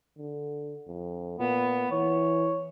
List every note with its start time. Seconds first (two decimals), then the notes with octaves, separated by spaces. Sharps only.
0.17 D3
0.87 F2
1.39 A#2 B3
1.91 E3 C#5